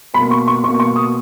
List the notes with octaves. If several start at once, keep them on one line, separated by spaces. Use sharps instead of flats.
B2 B5
A#3
C#6
C#6
B2 A#3 C#6
C#6
D#6